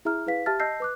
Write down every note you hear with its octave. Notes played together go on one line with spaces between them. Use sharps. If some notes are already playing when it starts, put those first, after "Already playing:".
E4 G#4 E5 A#5 F6
E4 G#4 B4 F5 B6
G4 E5 A5 F6 A6
D#5 A5 E6 G6 A#6 C7
B4 D6 F#6